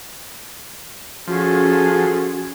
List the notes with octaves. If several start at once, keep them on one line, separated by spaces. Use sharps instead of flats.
F3 C#4 F#4 G#4 A4